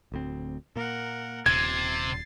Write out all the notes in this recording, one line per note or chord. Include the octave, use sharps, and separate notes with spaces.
D1 D2 C4
A#2 A#3 A#4 F#5
D#1 C3 G#6 A6 C7